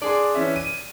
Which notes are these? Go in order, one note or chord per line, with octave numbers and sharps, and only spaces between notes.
D4 G#4 D5 C6
E3 C#4 E5
D#7